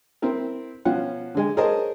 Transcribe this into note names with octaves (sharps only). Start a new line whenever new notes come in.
C4 E4 A#4
B2 F3 C#4 F4 F#5
D3 G#3 G#5
G#4 A#4 C5 C#5 D#5 A5